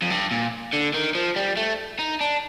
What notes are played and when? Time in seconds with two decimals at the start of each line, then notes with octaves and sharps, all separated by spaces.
0.02 F2
0.11 G2
0.32 A#2
0.74 D3
0.94 D#3
1.15 F3
1.36 G3
1.57 A3
1.99 D#4
2.21 D4